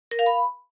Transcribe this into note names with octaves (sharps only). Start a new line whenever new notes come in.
A#4
F5
B5